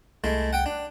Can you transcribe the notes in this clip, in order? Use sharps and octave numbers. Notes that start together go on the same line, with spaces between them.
C2 G#3 A3 E4
F#5 G5
D4